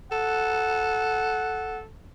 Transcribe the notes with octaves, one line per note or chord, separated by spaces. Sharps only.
A4 F#5